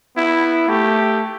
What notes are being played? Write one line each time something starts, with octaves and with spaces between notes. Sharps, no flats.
B3 E4
A3 G4